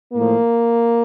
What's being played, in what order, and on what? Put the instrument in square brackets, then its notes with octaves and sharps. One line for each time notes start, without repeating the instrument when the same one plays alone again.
[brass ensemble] A2 F3 A#3